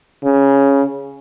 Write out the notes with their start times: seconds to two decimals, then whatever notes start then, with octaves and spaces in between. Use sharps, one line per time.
0.24 C#3